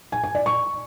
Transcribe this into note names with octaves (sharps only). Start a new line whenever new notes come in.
G#5
G#5
D5
C#6